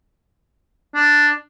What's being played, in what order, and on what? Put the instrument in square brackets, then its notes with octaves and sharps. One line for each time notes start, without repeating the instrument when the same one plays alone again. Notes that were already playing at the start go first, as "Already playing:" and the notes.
[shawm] D4